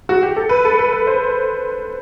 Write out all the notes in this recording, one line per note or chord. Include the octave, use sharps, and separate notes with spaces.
F#4
G4
A4
B4
A4
B4
B4
C5